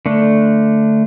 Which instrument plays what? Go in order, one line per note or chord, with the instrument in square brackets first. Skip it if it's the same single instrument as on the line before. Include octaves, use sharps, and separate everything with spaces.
[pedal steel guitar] D3 A3 D4